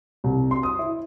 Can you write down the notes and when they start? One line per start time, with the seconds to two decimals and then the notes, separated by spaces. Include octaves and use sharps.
0.24 C2
0.51 C6
0.63 D#6
0.79 E4